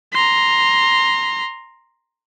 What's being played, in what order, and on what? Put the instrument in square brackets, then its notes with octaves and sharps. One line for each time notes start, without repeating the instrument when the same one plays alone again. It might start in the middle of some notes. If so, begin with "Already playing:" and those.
[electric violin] A#5 C6